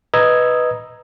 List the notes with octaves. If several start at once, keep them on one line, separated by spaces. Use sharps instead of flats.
B4 D#5 A#5 D#6 E6 G#6